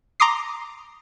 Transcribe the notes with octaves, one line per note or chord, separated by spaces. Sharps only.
A#5 C6 D6 D#6 C7